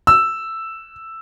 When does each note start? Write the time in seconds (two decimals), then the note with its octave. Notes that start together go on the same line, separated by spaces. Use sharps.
0.07 E6